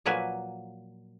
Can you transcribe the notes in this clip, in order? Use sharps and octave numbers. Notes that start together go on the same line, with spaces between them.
A#2 F3 F#3 A#3 B4 G#5